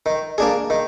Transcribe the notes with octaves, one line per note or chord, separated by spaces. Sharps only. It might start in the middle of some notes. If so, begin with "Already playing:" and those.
D#3
A#3 D4 G#4
D#3